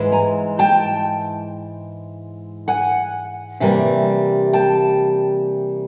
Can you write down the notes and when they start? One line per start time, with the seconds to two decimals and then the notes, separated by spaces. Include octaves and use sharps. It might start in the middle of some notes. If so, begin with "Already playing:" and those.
Already playing: G#2 E3 G#3
0.12 G#5 A#5
0.59 G5 A5
2.68 F#5 G#5
3.60 C3 E3 G3 A#3
4.53 G5 A5